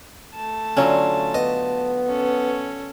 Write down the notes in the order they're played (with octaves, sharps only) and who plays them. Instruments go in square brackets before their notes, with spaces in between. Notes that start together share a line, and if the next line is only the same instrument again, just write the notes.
[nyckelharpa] A3 A5
[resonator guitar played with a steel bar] D3 F#3 F4 [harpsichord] C#4
[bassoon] B3 [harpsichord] D#5
[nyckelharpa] C#4 A4